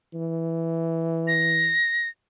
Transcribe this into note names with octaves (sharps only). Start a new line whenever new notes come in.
E3
A#6